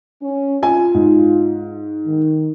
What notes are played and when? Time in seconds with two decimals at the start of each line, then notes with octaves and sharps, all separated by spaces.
0.22 C#4
0.63 F4 G#5
0.94 G#2
2.06 D#3